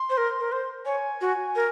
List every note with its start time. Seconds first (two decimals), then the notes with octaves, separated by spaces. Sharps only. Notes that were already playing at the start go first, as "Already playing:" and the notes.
Already playing: C6
0.10 C5
0.17 A#4
0.40 A#4
0.52 C5
0.85 C#5 G#5
1.21 F#4
1.56 A#4